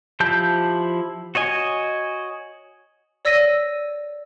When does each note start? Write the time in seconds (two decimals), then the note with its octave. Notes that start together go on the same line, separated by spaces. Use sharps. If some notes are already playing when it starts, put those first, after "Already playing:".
0.20 F3 E4 G4 A5 G6
1.35 F#4 C#5 D#5 G#5
3.25 C#5 D5 E6 A#6 B6 D#7